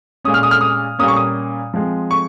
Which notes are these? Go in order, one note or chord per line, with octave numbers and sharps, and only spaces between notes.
A#2 G#3 C#4 D#6
F6
D#6
F6
D#6
A#2 G3 A#3 C#4 D#6
C#6
D#6
F3 G#3 C4
C#6